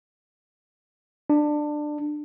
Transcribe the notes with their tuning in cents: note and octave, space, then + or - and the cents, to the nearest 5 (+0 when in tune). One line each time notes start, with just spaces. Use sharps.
D4 +20